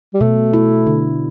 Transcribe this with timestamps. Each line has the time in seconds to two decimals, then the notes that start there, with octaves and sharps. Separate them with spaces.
0.14 G3
0.21 B2 A3
0.53 E4
0.87 D3